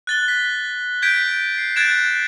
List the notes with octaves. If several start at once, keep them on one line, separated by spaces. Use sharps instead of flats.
F#6 A6 G7
B6
G6 G#6 B6 D7
C7
F#6 G#6 A6 D7 E7